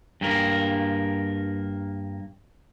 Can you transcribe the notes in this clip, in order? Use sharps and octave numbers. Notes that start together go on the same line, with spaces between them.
G2 A#3 A#4